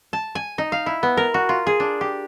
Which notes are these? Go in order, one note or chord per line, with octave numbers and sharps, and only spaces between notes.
A5
G#5
D#4
F5
E4
B3
A#4
F#4
F4
G#4
D4
G4